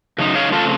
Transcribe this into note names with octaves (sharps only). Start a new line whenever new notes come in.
F#2 C#3 D#4
C#5 F5
C#3 A3 C4 F4 A4